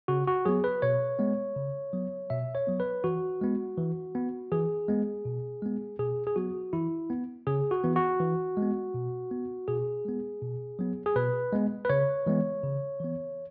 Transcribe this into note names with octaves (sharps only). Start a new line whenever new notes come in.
C#3 F#4
F#4
F#3 B3 G#4
B4
B2 C#5
G#3 B3
C#3
F#3 B3
B2 E5
C#5
F#3 B3
B4
E3 F#4
G#3 B3
E3
B3
E3 G#4
G#3 B3
B2
G#3 B3
B2 G#4
G#4
F#3 B3 F#4
E3 E4
B3
C#3 G#4
F#4
E3 B3
F#4
E3
G#3
B3
B2
B3
B2 G#4
G#3 B3
B2
F#3 B3
G#4
B2 B4
G#3 B3
B4
C#3 C#5
E3 G#3 B3
C#3
E3 B3